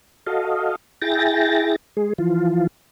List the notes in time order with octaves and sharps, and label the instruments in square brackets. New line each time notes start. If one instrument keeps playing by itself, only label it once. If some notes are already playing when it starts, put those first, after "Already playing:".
[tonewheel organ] F#4 A4 D#5 F5
E4 G#4 G5 A6 A#6
G#3 G#4
E3 F3 F4